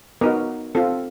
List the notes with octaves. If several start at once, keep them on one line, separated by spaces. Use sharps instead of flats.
B3 D#4 F#4 A#4
C4 F4 A4